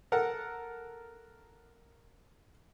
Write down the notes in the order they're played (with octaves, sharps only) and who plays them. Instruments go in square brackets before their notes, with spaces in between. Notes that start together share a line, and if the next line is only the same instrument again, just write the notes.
[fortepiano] A4 A#4 F#5